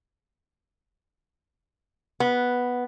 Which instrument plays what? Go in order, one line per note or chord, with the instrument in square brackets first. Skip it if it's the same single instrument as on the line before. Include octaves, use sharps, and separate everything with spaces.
[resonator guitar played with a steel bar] B3